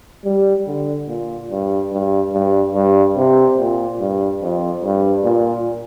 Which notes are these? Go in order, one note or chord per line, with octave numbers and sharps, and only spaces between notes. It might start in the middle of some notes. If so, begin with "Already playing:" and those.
G3
D3
A#2
G2
G2
G2
G2
C3
A#2
G2
F2
G2
A#2